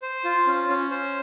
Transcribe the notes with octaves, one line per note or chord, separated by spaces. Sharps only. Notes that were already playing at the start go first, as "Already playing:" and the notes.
C5
F4
C#4
C#4
C5